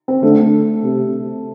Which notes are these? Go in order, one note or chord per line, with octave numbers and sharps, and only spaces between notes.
C4
D3 A3
C3